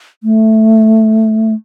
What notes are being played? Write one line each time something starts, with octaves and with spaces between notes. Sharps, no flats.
A3